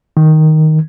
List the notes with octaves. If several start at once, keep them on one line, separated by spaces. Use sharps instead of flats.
D#3